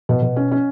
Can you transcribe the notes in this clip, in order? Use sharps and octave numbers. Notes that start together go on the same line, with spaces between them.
B2
B2
C#4
C#4